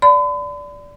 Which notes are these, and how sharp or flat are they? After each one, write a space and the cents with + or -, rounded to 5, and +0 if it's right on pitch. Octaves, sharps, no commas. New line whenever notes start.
D5 -15 B5 +40